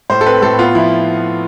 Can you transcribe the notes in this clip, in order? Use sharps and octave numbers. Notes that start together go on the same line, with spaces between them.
A2 C5
A4
C4 B4
A2 A4
B3 F4
F3 E4